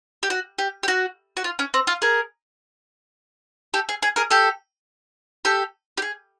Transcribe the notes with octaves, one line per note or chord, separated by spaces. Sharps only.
G4
F#4
G4
G4
F#4
F#4
F4
C#4
C4
F4
G#4 A#4
G4 A4
G#4
G#4
G#4 A#4
G4 A4
G4 A4
G4
G#4